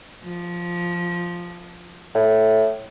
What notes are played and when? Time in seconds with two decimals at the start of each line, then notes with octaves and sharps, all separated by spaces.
0.23 F3
2.15 A2